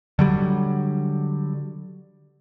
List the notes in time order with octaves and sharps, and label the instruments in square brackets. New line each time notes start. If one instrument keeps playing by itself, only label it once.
[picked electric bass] D3 F#3 G3